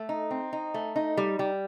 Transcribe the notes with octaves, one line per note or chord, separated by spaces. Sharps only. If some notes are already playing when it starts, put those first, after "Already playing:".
Already playing: A3
D#4
C4
D#4
A3
D#4
G3
G3